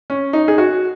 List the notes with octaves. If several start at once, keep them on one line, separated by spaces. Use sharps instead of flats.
C#4
D#4
G#4
F#4